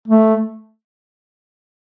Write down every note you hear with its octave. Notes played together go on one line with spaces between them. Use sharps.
A3